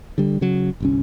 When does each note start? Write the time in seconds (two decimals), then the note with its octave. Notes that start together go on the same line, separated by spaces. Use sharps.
0.18 D3 G3
0.41 C#3 F#3
0.80 G1 C2 C#4